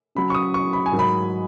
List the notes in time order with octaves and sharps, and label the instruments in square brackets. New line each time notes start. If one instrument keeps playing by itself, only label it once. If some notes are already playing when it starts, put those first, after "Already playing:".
[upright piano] C#3 F#3 C#4 B5
C#6
D#6
C#6
B5
G#5
G#2 D#3 F#3
B5